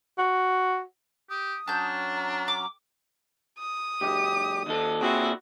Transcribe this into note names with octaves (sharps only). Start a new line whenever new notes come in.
F#4
G4 D#6
F#3 C#4 D4 A5 G6
A#5
D6
D#6
C#2 F#2 G4
D#2 A4
A#2 C4 E4 F#4 G#4